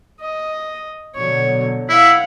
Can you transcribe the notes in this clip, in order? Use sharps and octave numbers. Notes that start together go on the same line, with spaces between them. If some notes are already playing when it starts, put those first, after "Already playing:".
D#5
B2 D3 F#3 C#5
E4 F5 F#5